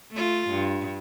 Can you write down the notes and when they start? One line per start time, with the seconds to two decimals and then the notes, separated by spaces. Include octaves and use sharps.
0.12 A3 F4
0.50 G2